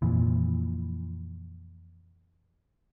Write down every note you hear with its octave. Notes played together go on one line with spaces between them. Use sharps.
F2 A#2 E3